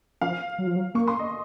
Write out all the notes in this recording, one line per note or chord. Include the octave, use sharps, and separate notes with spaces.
F3 F5
F#3
F3
F#3
A#3 C#6
C6
D#5